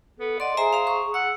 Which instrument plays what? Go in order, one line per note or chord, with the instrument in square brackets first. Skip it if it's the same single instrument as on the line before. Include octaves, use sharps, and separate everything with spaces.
[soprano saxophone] B3 [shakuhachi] A4
[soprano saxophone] D5 [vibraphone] D#5 C6 [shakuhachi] F#5
[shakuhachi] G#4 [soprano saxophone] C5 [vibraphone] E5 G#5 A#5
[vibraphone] F5 A#5
C#6
[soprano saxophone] F#5 [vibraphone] E6